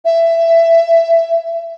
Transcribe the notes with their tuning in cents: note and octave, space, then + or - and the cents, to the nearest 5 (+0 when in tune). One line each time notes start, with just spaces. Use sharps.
E5 +15